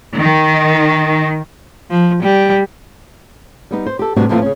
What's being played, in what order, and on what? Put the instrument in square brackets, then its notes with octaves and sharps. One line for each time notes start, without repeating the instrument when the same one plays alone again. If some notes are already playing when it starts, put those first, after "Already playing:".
[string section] D#3
[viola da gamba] F3
G3
[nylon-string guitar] G3 B3 D#4
C5
G4 A4
A2 C3 G3 B3 D4 F#4
A#2 E3 F3 A3 C4 F4
C#3 C#4